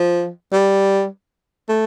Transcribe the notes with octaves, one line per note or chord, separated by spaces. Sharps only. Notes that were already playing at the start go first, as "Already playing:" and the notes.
Already playing: F3
G3
A3